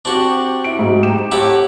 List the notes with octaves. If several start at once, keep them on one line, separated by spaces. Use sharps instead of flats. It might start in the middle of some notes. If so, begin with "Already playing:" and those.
C4 D4 F#4 G4 C5
E4 D7
G#2 F#3
G4 A#5 E7
A2 E4 G4 F#5